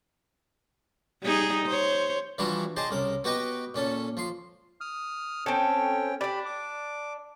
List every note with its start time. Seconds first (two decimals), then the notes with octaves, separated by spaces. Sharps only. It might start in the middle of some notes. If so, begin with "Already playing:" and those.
1.22 G3 D#4 G#4
1.66 C5 C#5
2.38 E3 F3 G3 D4 E4 F#4
2.76 G4 G#4 C5 D#5 A5
2.90 C2 C#3 A#4
3.24 B3 F#4 G4 B4 D#5 G5
3.74 A#2 C#4 A4
4.17 F3 C6
4.81 D#6 F6
5.46 C4 C#4 A4 C#5 G5
6.21 D4 G4 D5 B5
6.46 D6